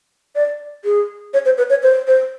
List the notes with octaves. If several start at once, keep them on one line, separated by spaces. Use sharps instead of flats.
D5
G#4
C#5
C5
B4
C#5
C5
C5